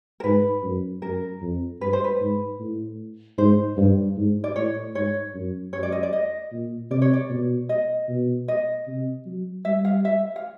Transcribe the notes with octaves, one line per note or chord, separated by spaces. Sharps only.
A#4
G#2 B4
F#2
F#2 A#4
F2
G2 B4
C5
B4
G#2
A2
G#2 C5
G2
G#2
D5
A2 C#5
G#2 C#5
F#2
F#2 C#5
D5
D#5
D5
D#5
A#2
C3 D5
C#5
D5
B2
D#5
B2
D#5
C3
F#3
G3 E5
F5
E5
F5